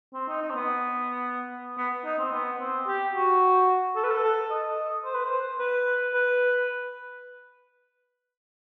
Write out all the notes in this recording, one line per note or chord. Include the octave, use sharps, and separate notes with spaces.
C4
D#4
D#4
C4
B3
B3
D#4
C4
B3
C4
G4
F#4
A4
B4
A4
A4
D#5
C5
B4
C5
B4
B4